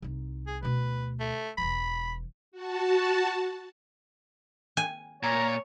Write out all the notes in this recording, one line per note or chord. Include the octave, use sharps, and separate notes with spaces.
C2 D#4
G#4
D2 B2 B4
A3
E1 E3 B5
F#4 A5
G#5
A#2 C#5 A#5